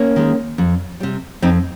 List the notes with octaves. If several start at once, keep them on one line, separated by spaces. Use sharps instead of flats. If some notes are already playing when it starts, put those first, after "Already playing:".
Already playing: A#3 C#4
D#3 G#3
F2
C3 G3
F2 C4 D#4